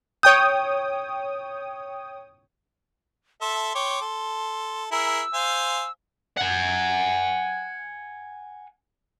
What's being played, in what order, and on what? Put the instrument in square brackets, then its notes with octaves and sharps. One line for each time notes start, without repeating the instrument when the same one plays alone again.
[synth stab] C#5 G5 D#6 [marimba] G6
[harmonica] A4 E5 [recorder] C6
[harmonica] C#5 G5 D6
A4
[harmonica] E4 G#4 A#4 [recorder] E6
[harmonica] C5 F5 G#5
[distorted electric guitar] F#5 G#5